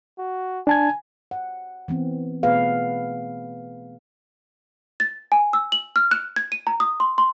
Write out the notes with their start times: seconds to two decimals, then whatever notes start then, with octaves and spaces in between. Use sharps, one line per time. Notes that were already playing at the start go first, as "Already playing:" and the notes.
0.18 F#4
0.67 D4 G#5 A5 G#6
1.31 F#5
1.88 E3 B3 C4
2.43 B2 A3 B3 G#4 B4 F5
5.00 A6
5.32 G#5
5.53 E6
5.72 F#7
5.96 F6
6.11 F#6
6.36 G#6
6.52 D#7
6.67 A#5
6.80 D#6
7.00 C6
7.18 C6